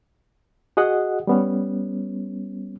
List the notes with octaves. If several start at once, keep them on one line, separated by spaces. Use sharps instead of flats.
F#4 G#4 D#5 F#5
G3 B3 C#4